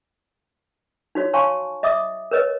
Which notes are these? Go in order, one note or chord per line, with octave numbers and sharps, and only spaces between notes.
D#4 F#4 C#5
C#5 F5 G#5 A5 C6 C#6
D#5 E5 D6 D#6
A#4 B4 C#5 D#5